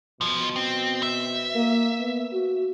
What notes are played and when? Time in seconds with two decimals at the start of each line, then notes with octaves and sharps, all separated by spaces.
0.21 B1 B2 F3
0.56 C4
1.03 E5
1.55 A#3
2.00 B3
2.33 F#4